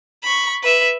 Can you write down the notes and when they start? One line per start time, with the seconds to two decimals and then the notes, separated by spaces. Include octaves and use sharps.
0.24 B5 C#6
0.63 B4 E5